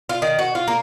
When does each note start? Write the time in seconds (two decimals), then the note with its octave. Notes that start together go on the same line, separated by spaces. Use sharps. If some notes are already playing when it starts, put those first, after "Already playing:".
0.09 F4
0.22 D#3
0.39 F#4
0.55 F4
0.68 A#3